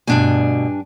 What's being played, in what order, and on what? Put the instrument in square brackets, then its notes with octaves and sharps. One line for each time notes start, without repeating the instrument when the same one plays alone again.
[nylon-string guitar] D2 B2 [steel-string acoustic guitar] G2 D4 G#5